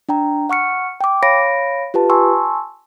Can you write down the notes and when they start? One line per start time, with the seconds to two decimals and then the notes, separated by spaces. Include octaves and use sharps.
0.09 D4 G5 A#5
0.49 F#5 C#6 F6 C#7
1.01 G5 D6
1.23 C#5 F5 B5 A#6 D7
1.94 F4 G4 B4 A5
2.10 G#5 A5 C6 C#6 E6